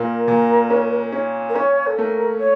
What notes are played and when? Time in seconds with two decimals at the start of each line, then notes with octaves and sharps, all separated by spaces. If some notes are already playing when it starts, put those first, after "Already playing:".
Already playing: A#2 A#4
0.28 A#2
0.70 C#4
1.13 C#4
1.49 A#4
1.55 C#4 C#5
1.87 A4
1.98 A3 A#4
2.40 C#5